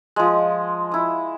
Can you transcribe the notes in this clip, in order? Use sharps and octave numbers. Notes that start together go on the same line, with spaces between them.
F3 G#3
E4 D#6